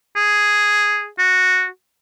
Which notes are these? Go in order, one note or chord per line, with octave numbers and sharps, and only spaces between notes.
G#4
F#4